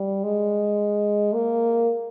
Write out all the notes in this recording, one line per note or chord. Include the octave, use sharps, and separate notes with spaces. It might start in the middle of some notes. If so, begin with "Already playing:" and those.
Already playing: G3
G#3
A#3